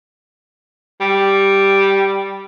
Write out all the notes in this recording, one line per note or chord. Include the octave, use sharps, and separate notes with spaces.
G3